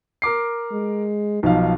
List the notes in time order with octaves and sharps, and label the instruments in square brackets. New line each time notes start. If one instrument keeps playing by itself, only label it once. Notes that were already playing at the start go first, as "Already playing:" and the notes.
[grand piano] A#4 D6 C7
[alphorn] G#3
[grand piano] B1 F3 F5 [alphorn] D#4